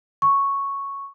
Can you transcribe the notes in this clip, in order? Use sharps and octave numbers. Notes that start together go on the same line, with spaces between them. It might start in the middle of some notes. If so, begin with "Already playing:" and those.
C#6